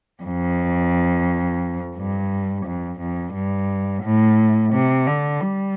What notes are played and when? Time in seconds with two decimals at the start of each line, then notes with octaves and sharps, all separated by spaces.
0.23 F2
1.96 G2
2.65 F2
2.99 F2
3.34 G2
4.03 A2
4.73 C3
5.07 D3
5.41 G3